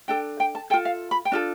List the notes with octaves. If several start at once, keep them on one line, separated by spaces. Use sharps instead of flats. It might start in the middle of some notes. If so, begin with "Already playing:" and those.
D4 A4 G5
G5
A5
F4 A4 G5
F5
B5
G5
D4 F4 A4